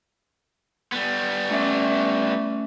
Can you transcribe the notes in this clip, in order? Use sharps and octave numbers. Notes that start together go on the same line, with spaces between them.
G3 B3
A3 C#4 E5